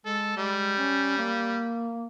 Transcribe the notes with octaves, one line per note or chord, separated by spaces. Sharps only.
G#3 A4
G3 G#3
C#4
A#3